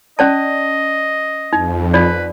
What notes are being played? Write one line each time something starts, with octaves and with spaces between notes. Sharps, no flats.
C#4 D5 D#5 A5
F2 D#4
D#4 F4 B4 D5